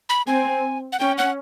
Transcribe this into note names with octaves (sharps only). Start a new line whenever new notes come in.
B5
C4 G#5
F#5
C#4 G5
F#5